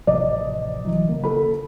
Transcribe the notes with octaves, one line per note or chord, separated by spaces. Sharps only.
A1 C3 F3 D5 D#5
E3 F#3
C#3 A#3
A4 B5